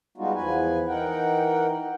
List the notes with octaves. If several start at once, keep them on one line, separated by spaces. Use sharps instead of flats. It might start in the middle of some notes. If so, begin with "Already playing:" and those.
G3 G#3 B3 D#4 F4 F#4
E2 F3 B4 G#5
E3 D#4 A#4 F#5 G5